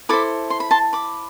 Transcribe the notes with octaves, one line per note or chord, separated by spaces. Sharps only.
E4 A4 C5 B5 D6
C6
B5
A5 C6
B5 D6